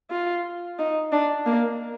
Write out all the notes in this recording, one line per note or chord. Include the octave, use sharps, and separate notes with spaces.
F4
D#4
D4
A#3